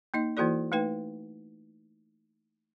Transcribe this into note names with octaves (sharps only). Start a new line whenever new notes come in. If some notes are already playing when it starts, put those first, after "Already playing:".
A#3 D#4 D#5
E3 A#3 E4 F#4 A4 D5
A3 D#4 B4 G5